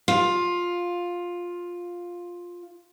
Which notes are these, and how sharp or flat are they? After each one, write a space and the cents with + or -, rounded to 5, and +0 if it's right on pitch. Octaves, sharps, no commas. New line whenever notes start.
F4 +10